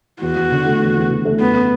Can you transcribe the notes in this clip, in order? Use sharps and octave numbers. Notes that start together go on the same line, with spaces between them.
E2 F#4
E2
D3
A3
E2
E2
D3
A3
F#2 B3